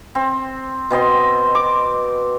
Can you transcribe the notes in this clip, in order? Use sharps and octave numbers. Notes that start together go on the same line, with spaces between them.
C4
B2 C4 D#5 C6
D6